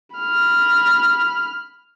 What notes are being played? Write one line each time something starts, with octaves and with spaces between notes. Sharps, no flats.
B5 F6